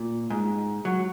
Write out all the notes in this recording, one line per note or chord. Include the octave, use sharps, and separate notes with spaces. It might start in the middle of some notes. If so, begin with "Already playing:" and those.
Already playing: A#2
G#2
F#3